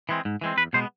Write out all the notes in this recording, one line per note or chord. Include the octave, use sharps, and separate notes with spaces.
E3 G#3 C4
G#2
E3 G#3 C4
E2 B4
B2 G#3 B3 C5